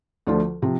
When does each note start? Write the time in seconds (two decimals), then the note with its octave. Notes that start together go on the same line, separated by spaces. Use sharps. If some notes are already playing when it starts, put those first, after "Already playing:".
0.27 D2 D3 F3 A3 F4
0.62 C3 F3